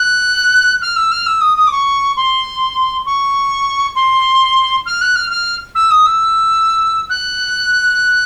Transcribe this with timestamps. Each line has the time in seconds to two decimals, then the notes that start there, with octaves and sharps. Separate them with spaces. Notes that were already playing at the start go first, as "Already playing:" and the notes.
Already playing: F#6
0.82 F6
0.96 E6
1.12 F6
1.26 E6
1.41 D#6
1.57 D#6
1.67 D6
1.72 C#6
2.17 C6
3.06 C#6
3.96 C6
4.86 F6
5.01 F#6
5.16 F6
5.30 F6
5.75 E6
5.91 D#6
6.06 E6
7.10 F#6